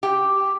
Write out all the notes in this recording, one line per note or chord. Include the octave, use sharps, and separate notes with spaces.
G4